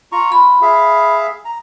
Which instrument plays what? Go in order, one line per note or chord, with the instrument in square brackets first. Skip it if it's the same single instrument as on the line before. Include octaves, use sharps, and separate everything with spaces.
[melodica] F4 A#5 C#6
[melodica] F4 [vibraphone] B5
[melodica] G#4 E5 F5
A#5